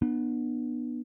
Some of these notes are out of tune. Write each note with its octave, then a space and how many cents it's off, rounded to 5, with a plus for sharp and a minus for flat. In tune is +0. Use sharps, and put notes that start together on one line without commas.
B3 -20 D4 +40